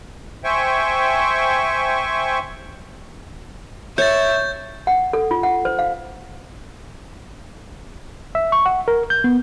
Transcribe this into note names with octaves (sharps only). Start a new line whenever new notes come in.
C5 E5 G5 G#5 C#6
C#5 E5 G6 A6
F#5
A4
F4
F#5
C5
F5
E5
C#6
F#5
A#4
G6
B3